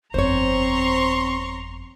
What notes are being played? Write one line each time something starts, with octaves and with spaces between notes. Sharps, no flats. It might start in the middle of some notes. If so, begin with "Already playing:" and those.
G1 F2 C4 C5 C#5 A#5 C6 C#6